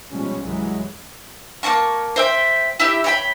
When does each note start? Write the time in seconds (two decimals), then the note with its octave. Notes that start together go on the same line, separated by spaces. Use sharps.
0.11 B2 F3 G3 G#3 C#4
0.42 C2 F#2 E3 F#3 G#3
1.63 A#3 C4 A5 C#6
2.16 C5 E5 G5
2.80 E4 G4 E5
3.04 C#5 G5 B5